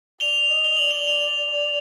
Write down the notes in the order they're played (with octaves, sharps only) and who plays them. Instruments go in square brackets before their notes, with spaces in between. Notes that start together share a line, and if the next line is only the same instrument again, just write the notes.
[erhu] D5 [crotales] F7 G7
[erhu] D#5
[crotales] G7
[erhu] D5 [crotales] F#7
[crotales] F7 G7
[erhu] D5 [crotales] F7 G7
[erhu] D5